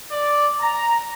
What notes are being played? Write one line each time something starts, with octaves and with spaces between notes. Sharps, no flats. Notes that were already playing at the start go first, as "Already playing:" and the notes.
D5
A#5